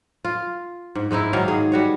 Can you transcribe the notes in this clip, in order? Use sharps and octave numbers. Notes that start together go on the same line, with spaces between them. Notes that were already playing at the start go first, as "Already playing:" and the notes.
F4
G#2
G#2 G#3 D#4 E4
G#2 D#3 F#3 F5
G#4
G3 F#4 C#5